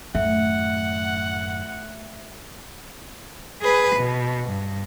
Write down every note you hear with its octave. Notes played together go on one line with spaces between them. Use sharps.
F#2 A2 D#3 A3 E5 F#5
G#4 B4
B2
G2